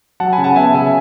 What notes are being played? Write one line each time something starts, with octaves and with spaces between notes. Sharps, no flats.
F#3 F#5 A5
G#5 B5
C#3
F#5 A5
B3 E5 G#5
C#3 E5 G#5